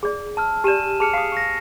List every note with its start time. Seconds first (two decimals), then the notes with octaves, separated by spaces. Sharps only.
0.03 G#4 D5
0.37 A5 E6 F6
0.64 G4 D5 G#5 D#7 E7
1.00 G#4 A5 F6 C#7 F7
1.13 F5 D#6 C7
1.32 C#6 A#6